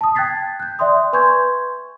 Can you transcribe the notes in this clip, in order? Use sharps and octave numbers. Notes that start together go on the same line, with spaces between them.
A5 D#6
G5 F#6 G#6 A6 B6 C7
F#6 G6
D5 E5 G5 C6 D#6
B4 G#5 C6 C#6 G6 G#6